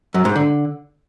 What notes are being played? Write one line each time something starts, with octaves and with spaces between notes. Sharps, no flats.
F#2
G#2
D3